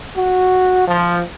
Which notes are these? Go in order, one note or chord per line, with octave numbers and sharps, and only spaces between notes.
F#4
F3